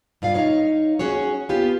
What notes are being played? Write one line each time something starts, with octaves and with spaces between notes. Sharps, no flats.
G2 F4 D5 F5
D#4 C#5 F5
C#4 F#4 G#4 C#5
B3 F4 G4